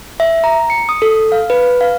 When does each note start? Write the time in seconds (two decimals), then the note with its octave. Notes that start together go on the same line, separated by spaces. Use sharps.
0.20 E5
0.44 A#5
0.70 C#7
0.89 D#6
1.02 A4
1.32 F5
1.50 B4
1.81 F5